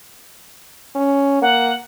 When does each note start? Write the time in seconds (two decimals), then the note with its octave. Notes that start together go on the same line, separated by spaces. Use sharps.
0.96 C#4
1.42 A#3 F#5